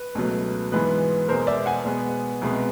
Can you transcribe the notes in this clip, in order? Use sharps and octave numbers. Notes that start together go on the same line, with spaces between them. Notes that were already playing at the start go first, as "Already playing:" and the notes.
Already playing: B4
C#2 B2 F#3 A3
G#2 E3 G#3 B3 B4
E2 B2 G#3 A#4 C5
D5 E5
F#5 G#5
B2 G#3 B3
C2 B2 G#3 B3